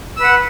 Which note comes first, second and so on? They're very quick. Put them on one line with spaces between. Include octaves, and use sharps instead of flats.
E6 B4 F#5